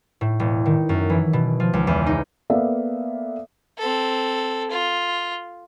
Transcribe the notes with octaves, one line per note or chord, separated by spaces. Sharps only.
A2
E1
D#3
F#2
E3
B2
F3
C#2
E2
D#4
A#3 B3 A4 D5 E5 F5
C4 A4
F4